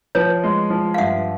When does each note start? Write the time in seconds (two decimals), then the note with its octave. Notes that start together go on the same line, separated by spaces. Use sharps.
0.15 F3 B4 C#5
0.43 G#3
0.70 F3
0.94 F5
0.98 G2 E5 F#5